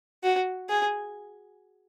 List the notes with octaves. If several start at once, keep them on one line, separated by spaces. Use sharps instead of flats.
F#4
G#4